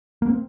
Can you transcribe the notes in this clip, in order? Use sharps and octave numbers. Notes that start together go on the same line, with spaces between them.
A#3
C4